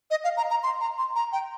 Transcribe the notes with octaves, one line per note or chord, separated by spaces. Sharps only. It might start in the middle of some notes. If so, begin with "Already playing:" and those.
D#5
F5
A#5
A#5
C6
A#5
C6
A#5
G5